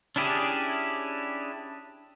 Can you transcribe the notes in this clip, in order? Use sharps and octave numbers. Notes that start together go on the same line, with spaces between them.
C#4 D4 E4 G4 G#4